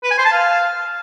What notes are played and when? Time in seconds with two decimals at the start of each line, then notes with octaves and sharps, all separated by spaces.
0.03 B4
0.11 G#5
0.18 C5
0.25 A5
0.32 F5